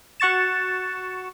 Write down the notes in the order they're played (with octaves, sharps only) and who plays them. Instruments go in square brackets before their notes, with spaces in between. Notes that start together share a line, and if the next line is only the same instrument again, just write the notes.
[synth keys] F#4 F#5 C#6 A6 E7